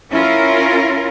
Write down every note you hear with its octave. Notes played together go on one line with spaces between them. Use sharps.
C#4 E4 F4 A#4